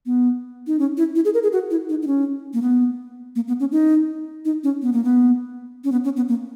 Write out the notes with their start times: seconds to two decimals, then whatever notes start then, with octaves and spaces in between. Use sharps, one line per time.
0.06 B3
0.67 D#4
0.79 C#4
0.97 E4
1.15 E4
1.25 G#4
1.34 A#4
1.43 G#4
1.53 F#4
1.71 E4
1.89 D#4
2.02 D#4
2.07 C#4
2.54 A#3
2.62 B3
3.36 A#3
3.48 B3
3.60 C#4
3.72 D#4
4.45 D#4
4.64 C#4
4.82 B3
4.93 A#3
5.04 B3
5.84 C#4
5.92 B3
6.04 C#4
6.17 B3
6.28 A#3